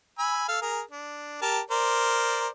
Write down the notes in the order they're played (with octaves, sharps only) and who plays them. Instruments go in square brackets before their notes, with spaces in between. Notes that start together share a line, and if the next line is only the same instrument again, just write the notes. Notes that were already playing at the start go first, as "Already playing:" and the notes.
[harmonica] G#5 B5 E6
A4 F5
G#4 A#4
D4
G4 A#4 A5
A#4 C5 D5